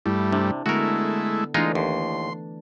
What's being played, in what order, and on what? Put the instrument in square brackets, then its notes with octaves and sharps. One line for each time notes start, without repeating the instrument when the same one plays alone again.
[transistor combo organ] G2 G3 A3 [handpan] E4
[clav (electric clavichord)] C3 [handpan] D4
[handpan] D3 B3 [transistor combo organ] G#3 A3 E4 [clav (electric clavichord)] F#4 A#4
[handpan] E3 A3 D4 [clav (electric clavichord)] G#3 D#4 F4
[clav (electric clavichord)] D#2 [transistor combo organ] C6